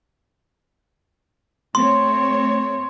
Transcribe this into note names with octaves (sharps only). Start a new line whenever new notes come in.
A3 C4 C#5 C6